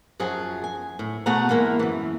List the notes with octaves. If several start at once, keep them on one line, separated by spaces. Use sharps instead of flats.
F#2 F3 F#3 G#4
G#5
A2
B2 A3 F#4 G#4 F#5 A#5
E3 G#3 A#3 E4
F#2 E3